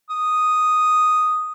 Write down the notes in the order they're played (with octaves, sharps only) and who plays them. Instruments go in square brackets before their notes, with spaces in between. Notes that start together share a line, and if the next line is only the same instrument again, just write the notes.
[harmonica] D#6